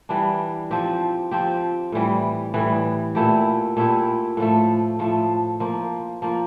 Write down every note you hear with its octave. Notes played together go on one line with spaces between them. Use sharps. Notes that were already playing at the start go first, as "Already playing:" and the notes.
E3 G3 D4
F3 C4 G4
F3 C4 G4
A2 E3 G3
A2 E3 G3
A#2 A3 E4 G4
A#2 A3 E4 G4
A2 F3 A3
A2 F3 A3
F3 A#3 F4
F3 A#3 F4